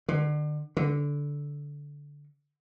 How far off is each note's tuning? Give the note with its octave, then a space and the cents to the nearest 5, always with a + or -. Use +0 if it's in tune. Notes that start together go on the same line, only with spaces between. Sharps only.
D3 +30
D3 -15